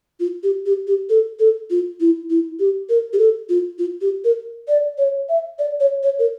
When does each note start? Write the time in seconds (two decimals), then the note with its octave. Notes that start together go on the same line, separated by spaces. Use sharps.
0.20 F4
0.43 G4
0.66 G4
0.87 G4
1.10 A4
1.39 A4
1.71 F4
2.00 E4
2.30 E4
2.60 G4
2.89 A#4
3.13 G4
3.19 A4
3.49 F4
3.79 F4
4.02 G4
4.25 A#4
4.68 D5
4.98 C#5
5.29 E5
5.59 D5
5.80 C#5
6.03 C#5
6.19 A#4